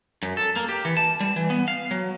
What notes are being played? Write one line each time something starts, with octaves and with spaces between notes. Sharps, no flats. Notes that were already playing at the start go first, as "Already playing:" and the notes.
F#2
A4
A#3
G4
E3
A5
G3
E3
B3
F5
F#3